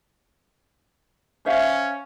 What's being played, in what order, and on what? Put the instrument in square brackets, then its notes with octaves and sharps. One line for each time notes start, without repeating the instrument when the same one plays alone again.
[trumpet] C#4 [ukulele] C5 E5 F5